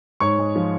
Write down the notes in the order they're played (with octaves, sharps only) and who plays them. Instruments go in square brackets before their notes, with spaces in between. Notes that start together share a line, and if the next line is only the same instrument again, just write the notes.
[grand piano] G#2 C#5 C#6
G#3
F3